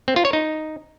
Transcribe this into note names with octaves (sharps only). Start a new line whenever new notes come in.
C4
F4
C#5
D#4